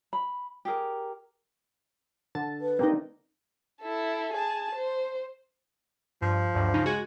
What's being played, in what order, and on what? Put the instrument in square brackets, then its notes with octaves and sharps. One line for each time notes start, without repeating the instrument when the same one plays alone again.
[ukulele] B5
G4 G#4 A#4
[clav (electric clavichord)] D3 [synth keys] A5
[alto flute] B4
[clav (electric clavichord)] A#3 G4 [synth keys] C4 D4 D#4
[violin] E4 A4
G#4 A5
C5
[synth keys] G2 [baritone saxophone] F3
[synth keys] D2 G2 F#3
C#3 D#4
[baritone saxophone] G#3 [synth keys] F#4